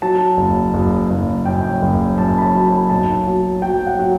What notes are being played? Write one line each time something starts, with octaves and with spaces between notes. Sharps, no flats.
F#3 A5
F#1
F#1
F#1
F#2 G5
F#1
F#2 A5
B5
A5
F#3
B5
B1 A5
F#3
F#3 G5
F#5
F#3